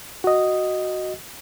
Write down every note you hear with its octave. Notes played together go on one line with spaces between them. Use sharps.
F#4 D#5